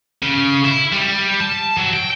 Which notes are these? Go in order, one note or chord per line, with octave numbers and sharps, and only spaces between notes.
C#3
E4
G3
A5
F#3
G5